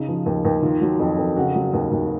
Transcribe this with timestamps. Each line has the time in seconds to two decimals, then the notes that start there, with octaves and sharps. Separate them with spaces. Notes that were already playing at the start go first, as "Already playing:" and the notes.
Already playing: C#3 D#4
0.08 F3
0.26 D#2
0.45 D#2
0.62 D#3 F4
0.81 F#3
0.99 F2
1.18 F2
1.36 C#3 F#4
1.55 F#3
1.73 D#2
1.92 D#2